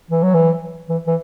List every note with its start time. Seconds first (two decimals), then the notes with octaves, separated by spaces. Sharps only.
0.11 E3
0.23 F#3
0.34 E3
0.89 E3
1.07 E3